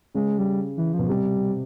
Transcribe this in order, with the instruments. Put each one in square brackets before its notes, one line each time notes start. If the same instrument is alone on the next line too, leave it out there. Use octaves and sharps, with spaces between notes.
[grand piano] C#3 [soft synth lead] G#3
[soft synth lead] G3
E3
F3
[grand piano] B2
[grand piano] C3 [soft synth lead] G3